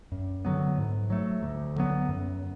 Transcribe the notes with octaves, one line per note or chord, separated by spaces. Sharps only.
F#2
D3 F#3 B3
G#2
F#3 A3
D2
D3 F#3 B3
F#2